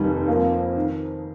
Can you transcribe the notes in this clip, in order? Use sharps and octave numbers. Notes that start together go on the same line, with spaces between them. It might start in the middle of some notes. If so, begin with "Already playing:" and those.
Already playing: F1 D#2 D#3 G3 D#4
F2 F3 A#3
D#3